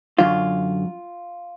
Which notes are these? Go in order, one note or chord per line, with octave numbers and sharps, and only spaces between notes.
F#2 D3 F#3 F4